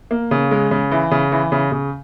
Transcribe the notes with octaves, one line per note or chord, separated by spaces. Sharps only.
A#3
C#3
G#3
C#3
E3
C#3
E3
C#3
C#3